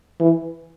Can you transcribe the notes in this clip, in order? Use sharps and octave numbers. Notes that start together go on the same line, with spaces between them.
E3